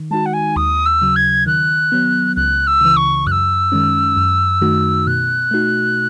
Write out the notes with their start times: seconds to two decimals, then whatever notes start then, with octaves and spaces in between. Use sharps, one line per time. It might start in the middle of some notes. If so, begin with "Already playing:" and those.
Already playing: D#3
0.11 G#3 D#4 F#4 A5
0.26 F#5
0.33 G#5
0.56 D#2 D#6
0.86 E6
1.01 C#3 F#3
1.16 G#6
1.46 D#3 F#6
1.92 F#3 B3
2.36 C#2 F#6
2.67 E6
2.81 C#3 E3
2.96 C#6
3.26 F#2 F#6
3.31 E6
3.72 D#3 G#3 C#4
4.17 F#2
4.61 D#3 A3 D#4 F#4
5.07 B2 F#6
5.51 A3 D#4 F#4